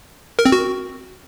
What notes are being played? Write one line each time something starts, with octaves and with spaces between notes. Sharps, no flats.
A#4
C4
F#4